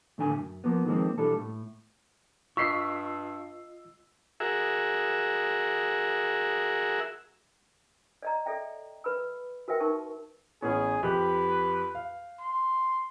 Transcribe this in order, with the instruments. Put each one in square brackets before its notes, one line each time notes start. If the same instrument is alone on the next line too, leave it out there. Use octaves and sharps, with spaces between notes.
[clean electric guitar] A2 D3 D4 G#5
F#2
F3 A#3 B3
D#3 F3 G#3 A#3 C4
B1 E3 G3 D4 A4
A2
[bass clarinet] G2 [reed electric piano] F4 D#5 [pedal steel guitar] C#6 [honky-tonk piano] E6 B6 C7
[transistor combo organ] F#4 G#4 A#4 E5
[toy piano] D5 D#5 A#5
A4 D5 E5 G5
B4 B5 E6
F#4 A#4 B4 E5 G5
D#4 A#4 A5 C#6
[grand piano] A1 B3 C#4 [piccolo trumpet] G#4
[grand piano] F2 G4 F#6 [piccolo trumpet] B4
[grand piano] F5
[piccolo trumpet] C6